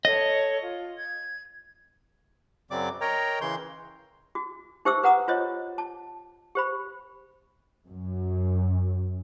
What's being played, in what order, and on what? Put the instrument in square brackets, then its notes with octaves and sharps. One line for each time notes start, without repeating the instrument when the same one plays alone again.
[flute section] A4 C#5 [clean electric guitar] D#5
[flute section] F4
G#6
[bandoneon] F#2 C#3 F#3 C4 D5 D6
A#4 C#5 D#5 G5 A#5
C#3 E3 C6 G6
[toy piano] F#4
D#4 G4 C5 E5 D6 E6
B4 F#5 A#5 D#6
F4 C5 C#5 D#5
A5
G4 C5 B5
[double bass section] F#2